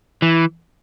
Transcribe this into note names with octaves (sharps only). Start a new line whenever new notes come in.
E3